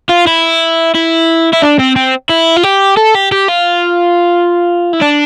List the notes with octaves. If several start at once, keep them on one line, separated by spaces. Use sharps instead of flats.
F4
E4
E4
E4
D4
C4
C4
E4
F4
G4
A4
G4
G4
F4
E4
D4